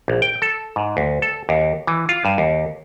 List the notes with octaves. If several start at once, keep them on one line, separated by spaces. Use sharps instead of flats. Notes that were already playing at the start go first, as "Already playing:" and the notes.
A#1
G5
A4
G#2
D2
A4
D#2
E3
F4
G2
D#2